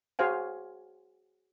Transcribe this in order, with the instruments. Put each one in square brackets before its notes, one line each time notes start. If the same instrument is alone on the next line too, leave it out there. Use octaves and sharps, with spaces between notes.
[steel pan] F#4 G#4 C5 F5 G#5